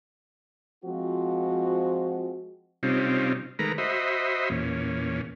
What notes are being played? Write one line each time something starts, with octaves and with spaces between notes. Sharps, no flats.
F3 G#3 C4 F4 F#4
C3 G3 C4 C#4 D#4 F4
D#3 G#3 A3 A#4 B4 A#5
F#4 C5 D#5 E5 B5
E2 A#2 C#4